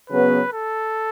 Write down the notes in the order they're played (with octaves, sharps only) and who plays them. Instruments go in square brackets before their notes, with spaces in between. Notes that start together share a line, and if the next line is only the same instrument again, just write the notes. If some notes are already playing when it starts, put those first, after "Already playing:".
[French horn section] C#3 F#3 B3 [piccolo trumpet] B4
[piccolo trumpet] A4